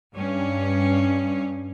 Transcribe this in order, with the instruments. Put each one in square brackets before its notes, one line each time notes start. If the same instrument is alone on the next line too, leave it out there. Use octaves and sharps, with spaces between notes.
[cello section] G2 C#4